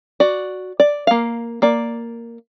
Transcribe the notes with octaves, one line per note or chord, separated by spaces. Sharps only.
F#4 D5
D5
A#3 F5
A#3 D5